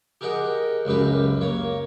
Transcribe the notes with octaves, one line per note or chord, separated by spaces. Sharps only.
G4 G#4 A#4 D#5 F#5
C#2 F#2 G4 B4
A#3 C#5